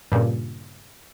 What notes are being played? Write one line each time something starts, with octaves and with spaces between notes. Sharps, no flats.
G2 A#2 C#3